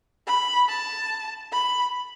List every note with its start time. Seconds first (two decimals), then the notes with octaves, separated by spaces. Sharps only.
0.27 B5
0.69 A5
1.52 B5